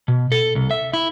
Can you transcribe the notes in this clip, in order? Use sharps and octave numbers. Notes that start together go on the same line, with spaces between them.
B2
A4
C2
E5
E4